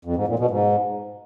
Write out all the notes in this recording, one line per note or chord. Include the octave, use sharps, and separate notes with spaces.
F2
G#2
A#2
B2
G#2